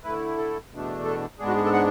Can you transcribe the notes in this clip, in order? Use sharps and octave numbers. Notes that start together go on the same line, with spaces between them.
D3 A3 E4 B4
A4
E2 B2 A3 D4
A4
G#2 G#3 B3 D4 G#4
F#4
G#4
A4
F#5